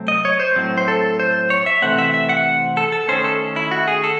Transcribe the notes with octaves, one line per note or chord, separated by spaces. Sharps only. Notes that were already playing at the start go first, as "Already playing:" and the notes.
Already playing: C3 F#3 A3 C4
D#5
C#5
C5
A2 F#3 C4
C5
A4
C5
C#5
E5
C3 E3 A3 C4 F#5
E5
E5
F#5
A4
A4
D#3 A3 C#4 C5
A4
E4
F#4
G#4
A4